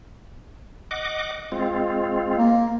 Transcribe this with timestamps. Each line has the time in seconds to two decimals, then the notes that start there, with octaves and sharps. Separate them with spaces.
0.91 D#5 F#5 D6
1.52 G#3 C4 F4
2.38 A#3